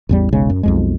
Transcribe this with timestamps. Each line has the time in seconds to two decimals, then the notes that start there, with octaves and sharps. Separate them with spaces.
0.09 A1 E2 G3
0.32 E1 B1 C#3 G#3
0.50 F#2
0.63 B1 F2 G#3